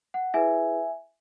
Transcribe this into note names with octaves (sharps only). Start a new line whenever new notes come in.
F#5
E4 G#4 B4 E5 G#5